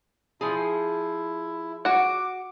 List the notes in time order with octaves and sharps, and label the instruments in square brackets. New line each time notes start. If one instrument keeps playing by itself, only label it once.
[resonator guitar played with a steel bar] F3 G#4 [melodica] E4
[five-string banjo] F#4 F#5 [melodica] D6